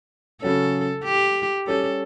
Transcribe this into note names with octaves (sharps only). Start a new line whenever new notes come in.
C#3 F#3 C#4 A4
G4
G3 C#4 G4 A4